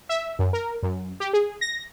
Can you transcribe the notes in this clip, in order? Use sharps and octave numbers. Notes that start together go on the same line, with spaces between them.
E5
F#2
A#4
F#2
G4
G#4
A#6